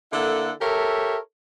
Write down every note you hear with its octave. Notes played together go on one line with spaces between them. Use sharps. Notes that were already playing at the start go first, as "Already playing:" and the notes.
D3 A#3 E4 A4 F#5
G4 A4 A#4 C#5 E5